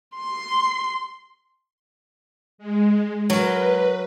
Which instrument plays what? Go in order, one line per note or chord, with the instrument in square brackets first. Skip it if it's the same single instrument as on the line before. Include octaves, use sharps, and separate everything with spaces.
[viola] C6
[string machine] G#3
[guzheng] F#3 A#4 [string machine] B4